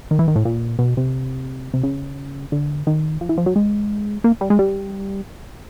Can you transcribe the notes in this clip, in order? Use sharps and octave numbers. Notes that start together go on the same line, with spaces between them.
D#3
E3
D#3
A2
A#2
B2
C3
C3
C#3
D3
D#3
F3
E3
F3
F#3
G#3
A#3
G3
G#3
G3